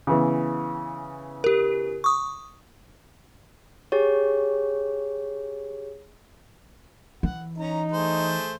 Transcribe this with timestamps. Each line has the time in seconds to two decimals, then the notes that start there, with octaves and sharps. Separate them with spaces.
0.07 C#3 E3 B3
1.44 G4 A#4
2.04 C#6 D#6
3.92 G4 G#4 C#5
7.23 E3 F#5
7.58 C#4 D#4 A#5
7.92 A3 G#4 C5